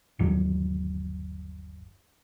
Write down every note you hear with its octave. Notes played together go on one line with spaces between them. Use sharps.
G1 D#2 F#3